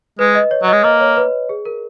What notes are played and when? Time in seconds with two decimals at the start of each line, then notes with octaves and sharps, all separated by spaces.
0.19 G#3 B4
0.35 D#5
0.51 C#5
0.63 F#3
0.68 G#3 D#5
0.84 A#3 D#5
1.01 C#5
1.17 B4
1.49 G#4
1.65 A#4